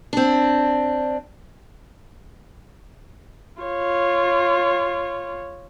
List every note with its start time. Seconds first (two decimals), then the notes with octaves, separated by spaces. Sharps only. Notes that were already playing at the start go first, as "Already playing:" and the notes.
0.13 C4 D4
3.62 F4 C#5